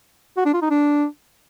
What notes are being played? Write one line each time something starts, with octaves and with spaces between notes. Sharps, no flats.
F#4
D4
F4
D#4
D4